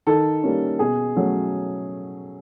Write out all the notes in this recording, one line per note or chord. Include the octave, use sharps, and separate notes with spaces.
D#3 A4
G3 A#3 C#4
B2 G#4
F#3 A3 C#4